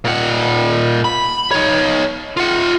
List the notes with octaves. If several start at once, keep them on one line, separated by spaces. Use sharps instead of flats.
A#2 F#5
B5
D#4 C#5
F4 F#5